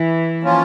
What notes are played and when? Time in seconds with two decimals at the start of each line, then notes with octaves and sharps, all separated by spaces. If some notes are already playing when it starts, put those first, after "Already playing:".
Already playing: E3
0.43 F3 A#3 C#4 F4